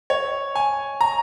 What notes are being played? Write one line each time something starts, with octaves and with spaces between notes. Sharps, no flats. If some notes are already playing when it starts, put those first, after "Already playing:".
C#5
G#5
A#5